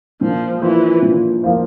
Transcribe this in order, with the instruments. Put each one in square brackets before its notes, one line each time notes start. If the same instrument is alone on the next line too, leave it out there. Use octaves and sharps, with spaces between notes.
[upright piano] A#2 [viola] F3
[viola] E3 [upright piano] F3 A#3 F4 C5
[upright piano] A#2
F3 A#3 F4 C5